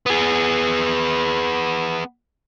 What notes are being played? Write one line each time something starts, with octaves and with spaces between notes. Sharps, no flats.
B3 G#4